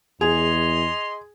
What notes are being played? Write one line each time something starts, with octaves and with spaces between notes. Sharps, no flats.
E2 G#4 D#5 C6 F7